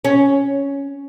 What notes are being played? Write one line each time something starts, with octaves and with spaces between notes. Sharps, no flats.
C#4